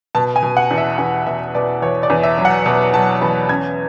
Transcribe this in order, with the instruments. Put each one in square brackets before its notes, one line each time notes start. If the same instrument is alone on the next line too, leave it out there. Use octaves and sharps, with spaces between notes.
[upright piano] B2 A5
G#5
B2
F#5
E2
E5
E2 G#5
B2 E5
B2 D5
E2 C#5
D5
E2
E5
F#3
F#5
B2
F#3 A5
E2 B5
C#4 G#6